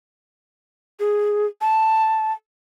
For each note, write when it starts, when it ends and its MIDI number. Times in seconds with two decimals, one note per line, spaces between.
1.00 1.46 68
1.61 2.32 81